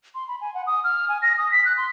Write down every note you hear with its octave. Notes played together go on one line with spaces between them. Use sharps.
C6
B5
G#5
F#5
D#6
F6
G#5
A#6
D#6
B6
F#6
C6